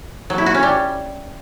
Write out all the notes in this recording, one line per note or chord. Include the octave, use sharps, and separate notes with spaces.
F#3
E4
F#4
C#4
G3